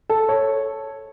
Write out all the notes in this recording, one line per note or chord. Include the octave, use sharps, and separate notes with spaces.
A4
C#5